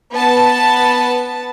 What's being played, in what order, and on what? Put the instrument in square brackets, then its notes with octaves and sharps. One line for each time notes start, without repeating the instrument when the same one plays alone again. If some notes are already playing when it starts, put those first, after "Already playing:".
[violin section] B3 A5